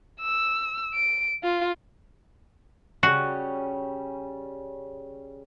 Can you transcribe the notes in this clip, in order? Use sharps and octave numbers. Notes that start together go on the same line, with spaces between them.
E6
D7
F4
C#3 G3 C#4 F#4